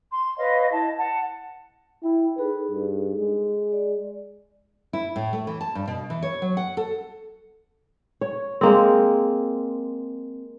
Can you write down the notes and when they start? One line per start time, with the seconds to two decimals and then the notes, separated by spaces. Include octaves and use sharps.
0.10 C6
0.38 B4 C#5 D#5 F5
0.72 E4 D#5 A5
0.98 F#5 A5
2.03 E4 G5
2.38 D#4 G#4 A4 B4
2.71 G2
3.17 G#3
3.68 G#4 D5
4.93 E4
5.16 A2
5.33 A3
5.47 E3
5.61 A5
5.75 G2
5.88 B2
6.10 E3
6.22 C#5
6.42 F#3
6.57 F#5
6.77 A4
8.21 C#5
8.61 G#3 A#3 C4